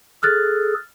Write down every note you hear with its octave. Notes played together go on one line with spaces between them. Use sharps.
G#4 A4 F6 F#6 A6